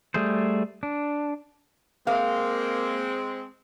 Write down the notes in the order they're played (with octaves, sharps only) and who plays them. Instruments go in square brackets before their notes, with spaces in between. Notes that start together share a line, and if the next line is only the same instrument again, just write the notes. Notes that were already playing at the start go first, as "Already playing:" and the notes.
[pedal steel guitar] G3 A3 G#4 C5
D4
[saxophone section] G#3 C4 [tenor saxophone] A#3 [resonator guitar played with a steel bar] F5